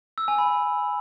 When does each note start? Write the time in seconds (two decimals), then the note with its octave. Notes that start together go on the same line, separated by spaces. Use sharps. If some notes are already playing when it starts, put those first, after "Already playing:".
0.18 E6
0.28 G#5
0.38 B5